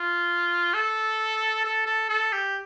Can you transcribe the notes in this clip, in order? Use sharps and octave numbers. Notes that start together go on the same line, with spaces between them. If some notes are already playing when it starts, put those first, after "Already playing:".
Already playing: F4
A4
A4
A4
A4
G4